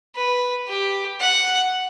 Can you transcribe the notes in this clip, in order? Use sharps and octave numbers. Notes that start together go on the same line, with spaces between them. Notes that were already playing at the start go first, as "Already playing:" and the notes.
B4
G4
F#5